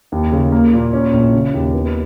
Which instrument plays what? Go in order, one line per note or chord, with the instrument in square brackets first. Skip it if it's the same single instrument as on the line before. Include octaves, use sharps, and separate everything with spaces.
[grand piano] D#2
C#3
A#3
A#2
C#4
A#1
C#3
D#2
B3